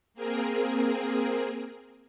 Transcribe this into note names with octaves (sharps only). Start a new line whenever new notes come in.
A#3 C4 G#4 A#4